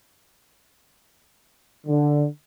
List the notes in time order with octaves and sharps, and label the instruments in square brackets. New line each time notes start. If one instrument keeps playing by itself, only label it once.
[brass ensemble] D3